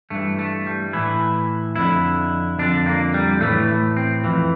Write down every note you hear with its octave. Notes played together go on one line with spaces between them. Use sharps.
G2 E3 A3
A3
G3
A2 E3 E4
F2 D3 E4
F2 D3 D4
A#3
G3
A2 E3 A3
C4
F2 E3